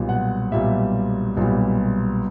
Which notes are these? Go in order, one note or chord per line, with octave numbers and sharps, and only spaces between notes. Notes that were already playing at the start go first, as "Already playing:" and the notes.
Already playing: B1 A#2 G3
F#5
B1 A#2 G3 E5
B1 A#2 G3